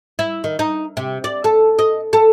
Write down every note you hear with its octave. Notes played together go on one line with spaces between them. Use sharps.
E4
D#3
D#4
C3
D5
A4
D#5
A4